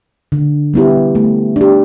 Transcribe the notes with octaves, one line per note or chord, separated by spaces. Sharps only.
D3
G3 B3 E4 G4
A3
D4 G4